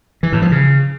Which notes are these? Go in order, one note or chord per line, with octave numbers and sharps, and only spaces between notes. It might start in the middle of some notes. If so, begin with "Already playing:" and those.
E3
A2
F3
C#3